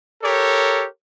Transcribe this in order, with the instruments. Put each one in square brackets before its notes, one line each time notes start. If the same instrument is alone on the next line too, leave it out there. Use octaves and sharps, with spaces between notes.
[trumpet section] G4 A4 A#4 C#5